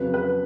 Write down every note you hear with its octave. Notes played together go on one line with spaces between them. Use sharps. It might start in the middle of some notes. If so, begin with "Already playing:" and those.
Already playing: F2 C#3 F#3 B4
B4